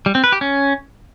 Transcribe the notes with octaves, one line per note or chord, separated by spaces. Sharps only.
G3
C4
B4
G4
C#4